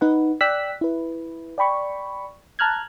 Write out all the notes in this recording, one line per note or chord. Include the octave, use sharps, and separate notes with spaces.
D#4 B4 F#5
D5 G5 E6 F#6 B6
E4 B4
D5 G5 B5 C#6
A5 A#5 F6 F#6 G#6